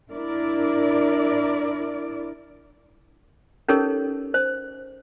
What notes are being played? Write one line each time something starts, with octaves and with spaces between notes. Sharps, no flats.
D4 E4 A#4 D5
C#4 D#4 G4 A4 A#4 C#5
C5